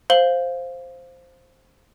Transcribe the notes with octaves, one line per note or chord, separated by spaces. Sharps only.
C5 F5 F#7 G7